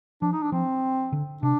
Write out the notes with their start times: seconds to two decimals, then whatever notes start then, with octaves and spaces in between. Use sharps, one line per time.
0.22 F3 D4
0.33 D#4
0.42 D4
0.52 F3 C4
1.12 D3
1.43 C3 D4